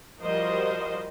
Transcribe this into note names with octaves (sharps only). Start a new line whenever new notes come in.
F3 G3 F#4 A#4 C5 D#5